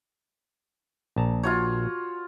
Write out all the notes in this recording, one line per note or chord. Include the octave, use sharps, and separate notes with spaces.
A#1 A5 A#5
F4 F#4 C#5